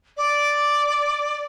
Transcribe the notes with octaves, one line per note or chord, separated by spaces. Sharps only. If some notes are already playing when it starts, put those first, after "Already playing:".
D5